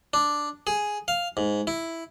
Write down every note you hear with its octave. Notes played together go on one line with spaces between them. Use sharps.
D4
G#4
F5
G#2
E4